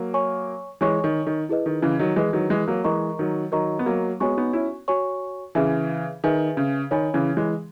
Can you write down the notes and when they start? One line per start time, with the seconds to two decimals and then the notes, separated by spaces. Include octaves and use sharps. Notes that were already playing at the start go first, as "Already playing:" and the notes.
Already playing: F#3 A#3
0.14 C#5 G#5 C#6
0.81 E3 G#3 C#5 G#5 C#6
1.04 D#3
1.27 D#3
1.49 E4 G#4 B4 D#5
1.66 D#3
1.82 C#3 E3
1.99 D#3 F#3
2.16 E3 G#3 E4 G#4 B4 D#5
2.33 D#3 F#3
2.50 E3 G#3
2.68 F#3 A#3
2.84 E3 G#3 A#4 D#5 A#5 C#6
3.19 D#3 F#3
3.52 D#3 F#3 A#4 D#5 A#5 C#6
3.79 B3
3.86 F#3 A#3
4.20 G#3 B3 F#4 C#5 G#5 C#6
4.37 B3 D#4
4.53 C#4 E4
4.88 F#4 C#5 G#5 C#6
5.55 C#3 E3 G#4 B4 E5 G#5
6.24 D#3 G#4 B4 E5 G#5
6.57 C#3
6.91 D#3 C#5 G#5 B5
7.14 C#3 E3
7.37 E3 G#3